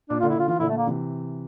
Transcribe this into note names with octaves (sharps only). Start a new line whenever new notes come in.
A#2 D4
A#2 D3 F4
E4
D3 F4
E3 F4
A#2 D3 E4
A3
A#3
C3 E3